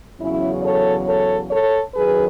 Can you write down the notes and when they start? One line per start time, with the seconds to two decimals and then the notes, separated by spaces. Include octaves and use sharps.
0.19 E2 C#3 F#3 C#4 E4
0.64 A4 C#5
1.07 A4 C#5
1.51 A4 C#5
1.95 F#2 D#3 F#3 G#4 B4